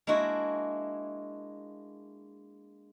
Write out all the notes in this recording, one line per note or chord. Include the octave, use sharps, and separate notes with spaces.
G#3 A#3 D4 E4 F#4